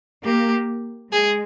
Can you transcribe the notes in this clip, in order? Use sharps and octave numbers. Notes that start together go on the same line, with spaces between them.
A#3 G4
G#3 G#4